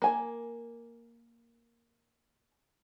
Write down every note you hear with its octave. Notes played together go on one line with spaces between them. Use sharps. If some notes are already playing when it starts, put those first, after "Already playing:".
A#3 G#5